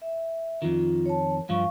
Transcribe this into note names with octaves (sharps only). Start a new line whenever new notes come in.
E5
F2 D#3 F4
C#5 A5
G2 F3 F5 C#6